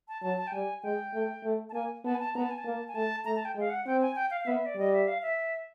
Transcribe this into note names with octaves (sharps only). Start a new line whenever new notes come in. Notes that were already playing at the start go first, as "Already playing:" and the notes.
A5
F#3 A5
A5
G5
G3 G#5
G#3 G5
A3
A3
A5
A#3 G#5
B3 A5
G#5
A5
B3 A#5
A5
G#5
A5
A#3
G#5
A3 A5
A3 A#5
A5
G5
G#3
F5
F#5
C4 G5
G#5
G5
F5
F5
B3 E5
D5
G3 D#5
E5
F5
E5